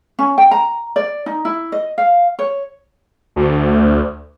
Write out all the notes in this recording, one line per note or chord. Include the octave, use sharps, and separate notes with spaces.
C#4
G5
A#5
D5
D#4
E4
D#5
F5
C#5
D2